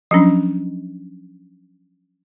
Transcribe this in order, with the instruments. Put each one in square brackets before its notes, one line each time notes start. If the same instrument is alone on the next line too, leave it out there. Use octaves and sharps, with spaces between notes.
[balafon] F3 F#3 C#4 D4